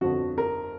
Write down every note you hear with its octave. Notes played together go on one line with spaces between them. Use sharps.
G1 F2 D3 F#4
A#4